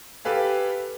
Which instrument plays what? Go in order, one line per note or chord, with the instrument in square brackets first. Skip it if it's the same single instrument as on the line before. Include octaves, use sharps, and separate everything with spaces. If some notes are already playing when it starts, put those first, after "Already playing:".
[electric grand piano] G4 A4 B4 F5 G#5